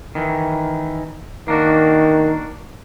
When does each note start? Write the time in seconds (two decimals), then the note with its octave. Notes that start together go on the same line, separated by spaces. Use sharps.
0.15 D#3 E3
1.48 D#3 A#3 D4 F#4